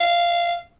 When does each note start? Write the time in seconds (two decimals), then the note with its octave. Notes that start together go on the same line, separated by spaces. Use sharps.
0.01 F5